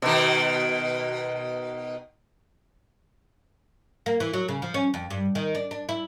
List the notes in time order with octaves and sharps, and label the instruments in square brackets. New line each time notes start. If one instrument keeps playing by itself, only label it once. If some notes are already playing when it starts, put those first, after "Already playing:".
[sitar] B2 D#3
[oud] A#3
E3
F#3
C#3
F3
C#4
F2
G2
D#3
D4
D4
E4